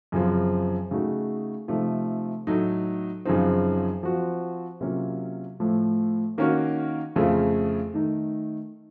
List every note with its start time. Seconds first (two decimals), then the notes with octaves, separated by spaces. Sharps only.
0.12 F#2 C#3 F3 C4
0.91 C#3 A3 D#4 F#4
1.68 C3 F3 A3 D#4
2.47 A2 F#3 A3 D#4
3.26 F#2 C#3 F3 C4 D#4
4.03 F3 C4 F#4
4.81 C3 F#3 A#3 C#4 F4
5.60 A2 F3 A3
6.38 D#3 A#3 C#4 F#4
7.16 F2 C#3 A3 C4 F4
7.94 D#3 A3 D#4